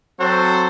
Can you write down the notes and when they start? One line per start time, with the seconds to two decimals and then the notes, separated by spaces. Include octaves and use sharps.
0.18 F#3 C4 F#4 A4 C5